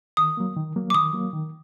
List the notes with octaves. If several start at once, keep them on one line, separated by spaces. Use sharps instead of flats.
D#3 D#6
F#3 A#3
D#3
F#3 A#3
D6
D#3 D#6
F#3 A#3
D#3